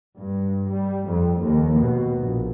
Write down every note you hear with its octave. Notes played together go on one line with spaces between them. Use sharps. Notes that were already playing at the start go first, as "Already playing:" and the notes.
G2
G3
F2
D#2
B2
A#1